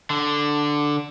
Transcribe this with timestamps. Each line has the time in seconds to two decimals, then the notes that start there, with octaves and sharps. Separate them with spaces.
0.10 D3